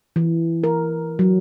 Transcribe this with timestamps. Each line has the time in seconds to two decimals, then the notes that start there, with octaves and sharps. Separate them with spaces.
0.16 E3
0.64 A#4
1.19 F#3